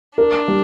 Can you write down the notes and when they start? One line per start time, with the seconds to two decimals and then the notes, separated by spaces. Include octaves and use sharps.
0.18 D4 A#4
0.48 G3